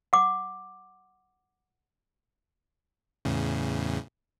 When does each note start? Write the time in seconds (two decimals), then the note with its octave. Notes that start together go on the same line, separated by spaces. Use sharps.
0.13 F#5 D6
3.25 E2 A2 C#3